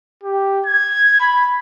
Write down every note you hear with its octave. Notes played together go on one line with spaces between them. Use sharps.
G4
G#6
B5